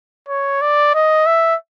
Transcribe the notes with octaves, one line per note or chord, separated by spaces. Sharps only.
C#5
D5
D#5
E5